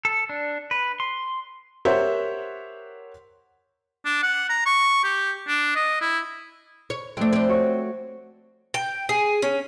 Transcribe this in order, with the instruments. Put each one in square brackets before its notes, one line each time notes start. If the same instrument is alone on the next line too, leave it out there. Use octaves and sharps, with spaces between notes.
[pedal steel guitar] A4
D4
B4
C6
[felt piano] G4 A#4 C5 C#5 E5 F#5
[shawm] D4
F#5
A#5
C#6
G4
D4
D#5
E4
[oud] C#5
[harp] F2 A3 [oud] C4 D4
[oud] C4 D4
[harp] F#4 C#5 C#6
[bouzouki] G5
G#4
C#4